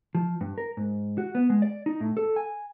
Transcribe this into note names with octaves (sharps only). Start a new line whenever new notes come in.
F3
G2
A#4
G#2
F#4
B3
G#3
D5
D#4
A2
A4
G#5